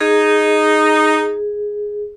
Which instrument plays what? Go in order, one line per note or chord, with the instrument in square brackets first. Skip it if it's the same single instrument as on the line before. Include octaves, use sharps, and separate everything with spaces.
[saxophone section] D#4 [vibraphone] G#4